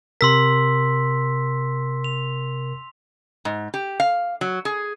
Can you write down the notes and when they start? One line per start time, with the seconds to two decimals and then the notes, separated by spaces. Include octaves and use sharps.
0.21 C3 A#4 C6 E6 B6
2.04 F7
3.45 G#2
3.74 G4
4.00 F5
4.41 F#3
4.65 G#4